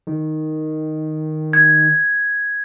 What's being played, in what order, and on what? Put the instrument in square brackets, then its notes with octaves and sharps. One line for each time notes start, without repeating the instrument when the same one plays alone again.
[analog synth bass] D#3
[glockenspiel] G#6